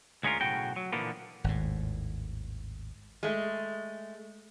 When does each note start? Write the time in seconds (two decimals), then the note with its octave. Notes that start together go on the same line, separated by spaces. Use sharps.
0.23 D2 G#3 C#4 F4 A#4
0.40 B1 A2 C#3 F#4 G5
0.76 F#3
0.93 A#2 D3 E3 F3 A#3 B3
1.44 G#1 D#2 A2
3.23 G#3 A3